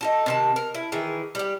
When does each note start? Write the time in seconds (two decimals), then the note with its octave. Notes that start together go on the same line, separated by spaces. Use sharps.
0.01 D#4 F#4 A4
0.26 C3 D#3 A5
0.56 A#4
0.75 E4
0.92 D#3 E3 G#4
1.35 G3 G4